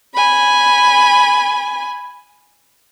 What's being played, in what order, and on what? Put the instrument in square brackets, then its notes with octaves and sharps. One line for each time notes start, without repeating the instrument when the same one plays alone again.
[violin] G#5 B5